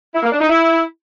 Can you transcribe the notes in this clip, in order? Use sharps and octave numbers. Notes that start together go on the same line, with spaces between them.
E4
A#3
D4
D#4
E4